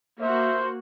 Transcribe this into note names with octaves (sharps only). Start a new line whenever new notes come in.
A#3 F#4 C5 E5